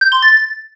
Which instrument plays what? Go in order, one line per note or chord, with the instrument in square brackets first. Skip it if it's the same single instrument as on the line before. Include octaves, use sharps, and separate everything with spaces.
[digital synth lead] G6
C6
A6